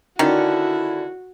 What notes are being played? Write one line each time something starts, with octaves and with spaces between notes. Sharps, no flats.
D3 D#3 C#4 E4 F#4